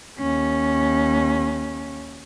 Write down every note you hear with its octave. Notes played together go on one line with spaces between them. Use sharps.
D#2 C#4